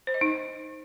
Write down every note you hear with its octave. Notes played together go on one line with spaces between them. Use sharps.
C5
D#5
D#4